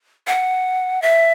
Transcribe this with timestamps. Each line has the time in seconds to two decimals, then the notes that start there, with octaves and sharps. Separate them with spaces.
0.27 F#5
1.02 E5